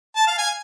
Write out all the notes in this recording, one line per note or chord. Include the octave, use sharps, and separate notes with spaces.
A5
F5
G#5